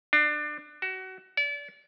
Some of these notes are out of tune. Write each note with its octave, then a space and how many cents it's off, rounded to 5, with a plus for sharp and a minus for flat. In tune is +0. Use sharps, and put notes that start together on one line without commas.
D4 +25
F#4 +25
D5 -35